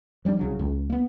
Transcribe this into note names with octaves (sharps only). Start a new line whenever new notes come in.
F3 G3 A3 D4
C2 C#3 F#3
C#2
A#3 B3